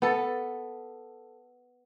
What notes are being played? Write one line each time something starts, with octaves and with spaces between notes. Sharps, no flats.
B3 A4